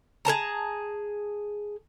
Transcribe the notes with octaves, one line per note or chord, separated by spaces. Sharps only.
G#4 A#4 A5 A#5